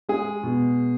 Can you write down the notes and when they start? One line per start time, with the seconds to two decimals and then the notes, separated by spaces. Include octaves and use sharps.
0.09 G#3 G#4
0.43 B2